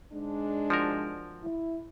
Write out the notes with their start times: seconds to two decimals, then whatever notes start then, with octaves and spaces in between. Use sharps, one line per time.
0.13 G#2 G#3 D4
0.70 F3 F#4 A#4
1.42 E4